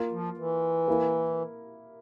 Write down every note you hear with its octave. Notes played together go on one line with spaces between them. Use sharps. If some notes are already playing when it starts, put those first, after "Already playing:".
Already playing: A#3 F4 A#4
F3
E3
A#3 E4 A#4